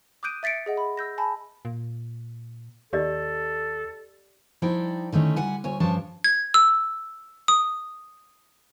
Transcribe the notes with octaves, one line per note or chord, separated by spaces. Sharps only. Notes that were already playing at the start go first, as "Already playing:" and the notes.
D6 D#6 F#6 G6 D7 D#7
E5 A6 B6 C#7 D7
G#4 D#5 F#5
B5
E6 G6 A#6
G#5 A5 B5
A#2
D#2 G4 A4 D5 D#5
F3 D#4 E4 D5 G5
D3 D#3 A3 C#4
G3 F#5 G#5
D2 C#5 G#5
G2 F3 C#4 D4 C#5 A5
G#6
E6
D#6